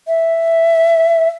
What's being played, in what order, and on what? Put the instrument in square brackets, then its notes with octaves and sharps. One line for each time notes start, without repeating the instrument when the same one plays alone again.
[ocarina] E5